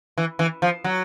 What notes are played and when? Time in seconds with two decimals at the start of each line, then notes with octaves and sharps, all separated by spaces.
0.18 E3
0.39 E3
0.62 F3
0.84 F#3